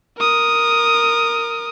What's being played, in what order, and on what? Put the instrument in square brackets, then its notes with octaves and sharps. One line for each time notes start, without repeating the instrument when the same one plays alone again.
[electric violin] A#4 D#6